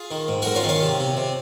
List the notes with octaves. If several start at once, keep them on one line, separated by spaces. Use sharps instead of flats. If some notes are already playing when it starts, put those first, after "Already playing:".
Already playing: F4 G#4
D#3
G#2
G#2 F#4 A#4
C#4 F4
D#3
C#4 F4
C3
C3
C3